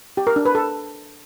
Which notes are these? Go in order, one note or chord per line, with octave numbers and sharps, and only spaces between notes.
G4
A#4
D4
B4
A4